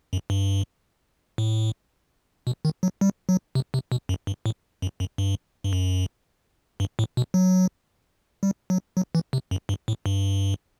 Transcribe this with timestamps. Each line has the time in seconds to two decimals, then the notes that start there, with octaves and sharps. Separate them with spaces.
0.13 F#2
0.30 G2
1.38 A2
2.47 B2
2.65 D#3
2.83 F#3
3.01 G3
3.29 F#3
3.55 C3
3.74 C3
3.92 B2
4.09 F#2
4.27 G2
4.46 A2
4.82 F#2
5.00 F#2
5.18 G2
5.64 G2
5.73 F#2
6.80 G2
6.99 A2
7.17 B2
7.34 F#3
8.43 G3
8.70 F#3
8.97 F#3
9.15 E3
9.33 C3
9.51 F#2
9.69 G2
9.88 A2
10.06 G2